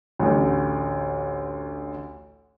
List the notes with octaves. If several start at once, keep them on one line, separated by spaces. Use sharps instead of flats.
A1 D2